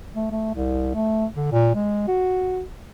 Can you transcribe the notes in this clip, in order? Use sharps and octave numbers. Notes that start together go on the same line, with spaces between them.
A3
A3
C2
A3
D3
A#2
G#3
F#4